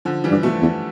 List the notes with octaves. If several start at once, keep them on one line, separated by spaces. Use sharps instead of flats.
D3 F3
E3 G3
G2
B2 F3 A3
E2